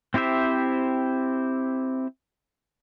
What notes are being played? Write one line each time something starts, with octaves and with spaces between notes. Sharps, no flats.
C4 E4 G4 C5 E5